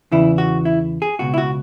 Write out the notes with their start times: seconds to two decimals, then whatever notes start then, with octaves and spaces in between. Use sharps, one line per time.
0.12 E2 C#3 E3 E4
0.38 F#4
0.65 E4
1.02 G#4
1.19 C#2 B2 F#4
1.34 E4
1.38 F#4